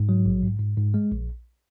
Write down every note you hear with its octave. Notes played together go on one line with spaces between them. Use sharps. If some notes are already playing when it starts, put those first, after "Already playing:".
Already playing: G#2
F#3
A#1
G#2
G#2
G#2
G#3
A#1